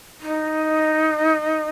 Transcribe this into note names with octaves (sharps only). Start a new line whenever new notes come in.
D#4